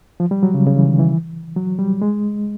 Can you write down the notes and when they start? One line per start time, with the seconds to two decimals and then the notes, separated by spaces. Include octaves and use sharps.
0.20 F3
0.31 G3
0.43 F#3
0.54 C#3
0.66 C#3
0.77 E3
0.88 D#3
0.99 E3
1.57 F#3
1.79 G3
2.02 G#3